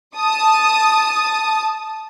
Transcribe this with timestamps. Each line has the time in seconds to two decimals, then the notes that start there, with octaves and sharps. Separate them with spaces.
0.17 A5 D#6